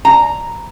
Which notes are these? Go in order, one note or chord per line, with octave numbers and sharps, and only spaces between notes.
A#5